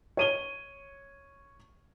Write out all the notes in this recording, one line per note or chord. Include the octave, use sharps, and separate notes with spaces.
C#5 D#7 G7